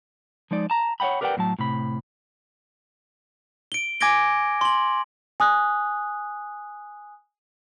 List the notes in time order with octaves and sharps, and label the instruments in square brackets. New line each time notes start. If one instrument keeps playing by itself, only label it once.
[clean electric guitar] F3 G#3 D#4 D5
A5 A#5
C#5 D5 F#5 G5 B5
G4 A#4 B4 D5 F#5 G5
A2 F#3 A5
A2 C3 B5
[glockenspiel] D7 G7
G#5 D6 G#6 A#6 D7 G7
C6 F#7
[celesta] G#5 D#6 F#6